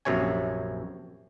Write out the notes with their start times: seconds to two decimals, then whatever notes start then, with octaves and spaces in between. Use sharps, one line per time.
0.05 A#1 F#2 C3 C#5 G#5